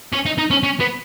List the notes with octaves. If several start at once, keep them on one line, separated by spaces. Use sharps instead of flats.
C#4
D#4
D#4
C#4
C#4
B3